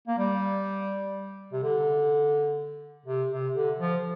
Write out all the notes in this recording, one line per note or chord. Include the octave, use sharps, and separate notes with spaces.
A#3
G3
C3
D3
C3
C3
D3
F3